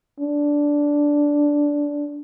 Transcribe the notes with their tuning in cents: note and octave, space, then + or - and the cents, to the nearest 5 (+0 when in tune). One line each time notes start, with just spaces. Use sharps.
D4 -10